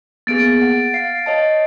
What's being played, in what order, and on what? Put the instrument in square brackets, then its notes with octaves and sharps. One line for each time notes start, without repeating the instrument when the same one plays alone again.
[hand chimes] A#3 B3 G#4 [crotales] A6 D7
[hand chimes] F#5
[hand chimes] F5 [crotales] C7
[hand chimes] C#5 D#5 A5